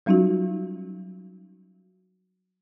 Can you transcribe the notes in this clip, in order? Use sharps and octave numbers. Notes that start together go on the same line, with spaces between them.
F#3 G3 C#4 D#4 F4 F#4